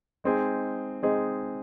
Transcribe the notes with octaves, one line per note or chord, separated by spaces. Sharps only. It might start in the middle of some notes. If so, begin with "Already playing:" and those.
G#3 C4 D#4 G#4
G#3 C4 D#4 G#4